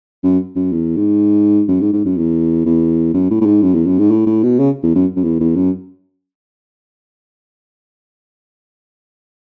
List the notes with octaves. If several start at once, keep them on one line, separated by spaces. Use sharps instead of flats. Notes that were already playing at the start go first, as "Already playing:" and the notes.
F#2
F#2
E2
G#2
F#2
G#2
G#2
F#2
E2
E2
F#2
A2
A2
G#2
F#2
E2
F#2
G#2
A2
A2
B2
C#3
E2
F#2
F#2
E2
E2
F#2